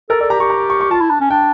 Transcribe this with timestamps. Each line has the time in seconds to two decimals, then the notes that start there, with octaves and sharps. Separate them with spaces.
0.09 A4 A#4
0.20 A4 D5
0.30 G4 A#5
0.40 G4 C#6
0.50 A#5
0.70 C#6
0.81 C#6
0.91 F4 A5
1.01 E4
1.10 D4
1.21 C#4
1.30 D4 G5